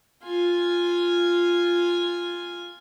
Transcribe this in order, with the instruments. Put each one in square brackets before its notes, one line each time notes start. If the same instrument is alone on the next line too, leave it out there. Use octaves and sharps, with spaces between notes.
[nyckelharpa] F4 G#5